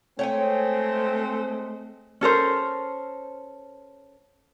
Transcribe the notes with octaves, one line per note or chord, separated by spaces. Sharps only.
G#3 A3 C4 C#5 G5 G#5
C#4 A4 A#4 C5